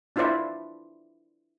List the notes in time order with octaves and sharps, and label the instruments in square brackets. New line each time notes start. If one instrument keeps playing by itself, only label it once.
[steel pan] D4 E4 F4 C5 D5 E5